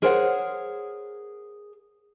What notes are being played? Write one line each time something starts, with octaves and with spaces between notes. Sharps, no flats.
G#4 A#4 C5 C#5 E5 F#5